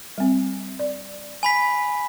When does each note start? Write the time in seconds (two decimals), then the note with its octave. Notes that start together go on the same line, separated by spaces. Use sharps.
0.18 G3 C4
0.79 D5
1.43 G#5 B5 B6